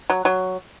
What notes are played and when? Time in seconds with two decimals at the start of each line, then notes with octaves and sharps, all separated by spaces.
0.10 F#3
0.25 F#3